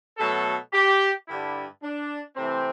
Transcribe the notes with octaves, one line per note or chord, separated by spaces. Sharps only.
B2 F#3 A3 A4
G4
G2 D3 G3 E4
D4
C3 E3 A3 C4